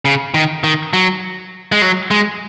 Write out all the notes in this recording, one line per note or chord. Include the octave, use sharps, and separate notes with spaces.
C#3
D#3
D#3
F#3
G#3
F#3
G#3